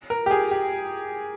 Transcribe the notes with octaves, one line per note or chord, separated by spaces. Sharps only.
A#4
G4
G#4
G4